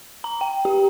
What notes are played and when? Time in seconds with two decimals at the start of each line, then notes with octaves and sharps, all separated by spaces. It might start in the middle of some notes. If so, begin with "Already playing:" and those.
0.24 A#5
0.41 G5
0.65 G4